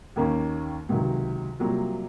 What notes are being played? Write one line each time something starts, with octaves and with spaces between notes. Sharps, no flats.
D#2 D#3 A#3 C#4
C#2 C3 D#3 F#3
C2 C3 F#3 A#3 F4